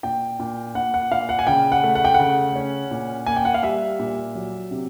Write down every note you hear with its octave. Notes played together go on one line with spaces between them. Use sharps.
A#2 G5
A#2
A#2 F#5
F#5
A#2 F5
F#5
G#5
C#3 G5
F#5
A3
F#5
G5
C#3 F#5
C#4
A#2
A#3 G#5
G5
F#5
F5
G3 E5
A#2
F#3
C3